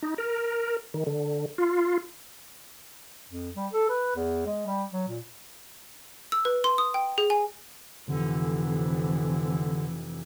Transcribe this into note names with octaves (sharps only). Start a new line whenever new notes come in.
D#4
A#4
D#3
D3
F4
F2
G3
A4
B4
E2
G#3
G3
F#3
A#2
E6
B4
C6
D#6
G5
G#4
G#5
F1 D3 E3